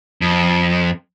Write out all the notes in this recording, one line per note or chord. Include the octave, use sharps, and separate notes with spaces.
F2